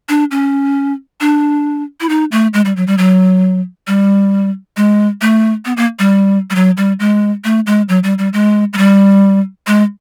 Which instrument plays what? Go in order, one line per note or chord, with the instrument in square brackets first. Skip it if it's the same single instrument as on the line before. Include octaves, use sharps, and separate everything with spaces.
[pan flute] D4
C#4
D4
E4
D#4
A3
G#3
G3
F#3
G3
F#3
G3
G#3
A3
B3
A#3
G3
G3
F#3
G3
G#3
A3
G#3
F#3
G3
G3
G#3
G#3
G3
G#3